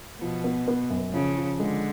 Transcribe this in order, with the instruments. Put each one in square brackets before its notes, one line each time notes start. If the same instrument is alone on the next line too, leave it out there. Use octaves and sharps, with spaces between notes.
[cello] B2 [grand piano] F3
[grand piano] B3
B3
F#2
[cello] C#3 [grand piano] F3
[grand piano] F3
[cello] D3 [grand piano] G#3